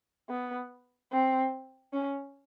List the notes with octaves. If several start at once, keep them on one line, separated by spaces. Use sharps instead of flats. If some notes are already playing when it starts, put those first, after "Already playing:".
B3
C4
C#4